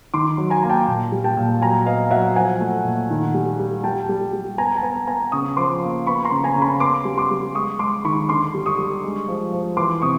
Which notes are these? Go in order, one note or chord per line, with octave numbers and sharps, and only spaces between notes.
D#3 C6 D6
F#3
G#5 A#5
A#3 A#5
G5 A5
A#2
G3
G5 A5
A#2
F#3 G#5 A#5
B3 D#5 F5
F#3 E5 F#5
F3 F#5 G#5
A3
A#2
D#3
G3
G3
G3 G5 A5
G3
G3
B3 G#5 A#5
A5
B3 G#5 A#5
B3 G#5 A#5
C#3 C#6 D#6
F3 C6 D6
A#3
B3 B5 C#6
A#5 C6
C#3
G#5 A#5
C#3
A5 B5
B3 C6 D6
G3
C6 D6
G3
G#3 C#6 D#6
G#3 C6 D6
D#3 B5 C#6
D3 C6 D6
G3
C#6 D#6
G3
G#3
F3
F3
E3 C6 D6
C3 C#6 D#6